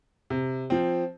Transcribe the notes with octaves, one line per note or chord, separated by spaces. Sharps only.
C3
F3 C4